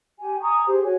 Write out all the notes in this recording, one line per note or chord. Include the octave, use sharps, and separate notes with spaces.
G4 G#5
G#5 A#5 C#6 D#6
G4 G#4 C5
F#4 C#5 G#5